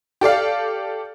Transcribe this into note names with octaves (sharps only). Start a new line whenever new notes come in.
G4 A4 D5 F5